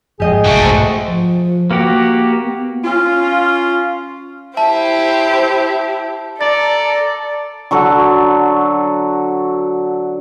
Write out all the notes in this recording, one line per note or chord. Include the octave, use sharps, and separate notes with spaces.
F#1 F2 G#2 G4 G#4 D#5 G5
F1 B1 A3 F#4
G#2 C5
F3
A#3 F#4 G4
B3
C#4 F4
E4 G4 C5 E5 A5
A4 D5 A#5 A6
D3 F#3 F#4 A4